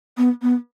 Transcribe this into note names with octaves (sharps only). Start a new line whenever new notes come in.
B3
B3